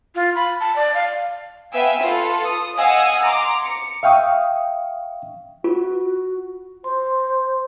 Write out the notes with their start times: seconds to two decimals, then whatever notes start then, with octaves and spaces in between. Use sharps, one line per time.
0.15 F4
0.35 B5
0.60 A5
0.76 D5
0.94 F5
1.73 B3 E5 F5 G5 G#5 E6
2.01 F4 A4 B4
2.45 D#6
2.77 D#5 F5 F#5 G#5 D#6 E6
3.24 A#5 C6 D6
3.64 C#7
4.03 E5 F5 G5 C#6 D#6
5.64 F4 F#4
6.84 C5 C6